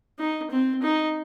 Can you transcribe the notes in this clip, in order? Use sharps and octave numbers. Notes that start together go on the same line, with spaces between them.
D#4
C4
D#4